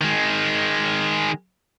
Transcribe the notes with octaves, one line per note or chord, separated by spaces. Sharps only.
D#3 G#3